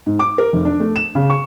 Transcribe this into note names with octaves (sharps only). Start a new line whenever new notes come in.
G#2
D6
A#4
F1
D4
A3
E7
C#3
C#6